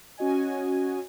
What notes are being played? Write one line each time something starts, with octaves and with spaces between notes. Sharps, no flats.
C#4 F#4 D#5 G#5